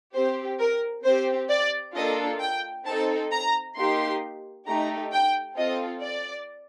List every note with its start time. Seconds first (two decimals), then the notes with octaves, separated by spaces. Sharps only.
0.14 C4 G4 C5
0.60 A#4
1.05 C4 G4 C5
1.50 D5
1.95 A#3 D4 F4 A4 D#5
2.41 G5
2.86 C4 D#4 A4 A5
3.32 A#5
3.77 A#3 D#4 G4 C6
4.68 A3 D#4 G4 A#5
5.13 G5
5.58 C4 F4 A4 D#5
6.03 D5